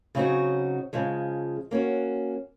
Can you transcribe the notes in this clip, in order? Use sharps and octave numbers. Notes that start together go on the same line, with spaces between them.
C#3 F#3 C4 D#4 F#4
C#3 F3 G#3
A#3 C#4 F#4